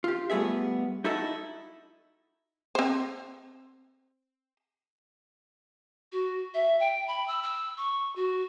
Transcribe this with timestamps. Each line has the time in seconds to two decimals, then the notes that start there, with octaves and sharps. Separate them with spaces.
0.04 F4 G4
0.30 G3 A3 B3 G#4 E5
1.04 D#4 E4 F#4 A4 D#5
2.75 C4 C5
6.12 F#4
6.54 E5
6.80 G5
7.08 B5
7.27 E6
7.43 E6
7.77 C#6
8.16 F#4